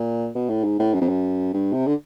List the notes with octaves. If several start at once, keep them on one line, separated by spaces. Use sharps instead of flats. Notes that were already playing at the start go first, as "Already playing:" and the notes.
Already playing: A#2
B2
A2
G#2
A2
F#2
F2
F#2
G2
C3
D3